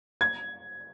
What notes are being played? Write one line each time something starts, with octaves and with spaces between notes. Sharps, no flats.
G#6